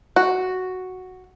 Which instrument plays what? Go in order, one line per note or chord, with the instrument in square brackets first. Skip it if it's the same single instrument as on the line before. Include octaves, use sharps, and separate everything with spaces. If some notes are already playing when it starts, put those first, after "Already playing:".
[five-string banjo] F#4